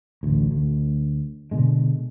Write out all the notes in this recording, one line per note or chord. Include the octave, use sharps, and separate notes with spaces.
A1 D2
D2
B2 D3 G#3